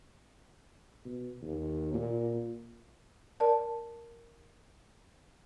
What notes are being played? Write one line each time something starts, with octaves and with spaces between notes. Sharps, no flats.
B2
D#2
A#2
A#4 D5 A5